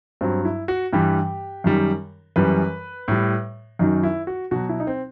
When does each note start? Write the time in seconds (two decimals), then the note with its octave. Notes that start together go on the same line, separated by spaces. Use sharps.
0.21 G2 F#3 C4
0.45 E4
0.68 F#4
0.93 G2 E3 G3 G4
1.64 F#2 D#3 G3
2.36 F#2 E3 G3 B4
3.08 A2 G3
3.79 F#2 D#3 F#3 D#4
4.03 E4
4.27 F#4
4.51 B2 F#3 F#4
4.69 E4
4.80 D#4
4.87 C4